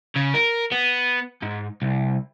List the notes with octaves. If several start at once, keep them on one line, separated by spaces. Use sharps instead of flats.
C#3
A#4
B3
G#2
C2